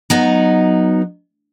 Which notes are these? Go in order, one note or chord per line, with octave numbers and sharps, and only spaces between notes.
F#3 B3 D#4